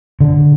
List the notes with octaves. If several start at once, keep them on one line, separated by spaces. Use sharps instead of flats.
D3